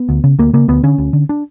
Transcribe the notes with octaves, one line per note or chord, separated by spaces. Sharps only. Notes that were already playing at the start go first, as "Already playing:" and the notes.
Already playing: B3
D2
C#3
D2 A#3
C#3 A#3
D2 B3
D3 C#4
D2
D3
D4